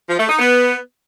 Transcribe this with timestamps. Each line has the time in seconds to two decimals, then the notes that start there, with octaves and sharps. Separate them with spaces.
0.09 F3
0.19 A3
0.29 D#4
0.39 B3